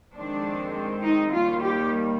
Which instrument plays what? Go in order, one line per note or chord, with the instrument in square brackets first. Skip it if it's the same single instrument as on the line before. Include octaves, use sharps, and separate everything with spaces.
[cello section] F2 D#3 G#3 C4 D4
D#4
D#2 D#3 G3 A#3 F4
G4